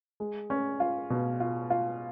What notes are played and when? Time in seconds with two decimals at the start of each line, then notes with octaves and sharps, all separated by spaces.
0.20 G#3
0.50 C#4
0.80 F4
1.10 B2
1.40 F4
1.70 F4